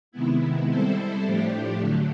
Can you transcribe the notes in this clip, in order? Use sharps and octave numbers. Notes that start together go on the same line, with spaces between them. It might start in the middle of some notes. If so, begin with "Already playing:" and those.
C3 D#3 G#3 B3 E4
G3 C4 E4 A4 C5
A2 F3 A3 D4 G4
D3 F#3 A3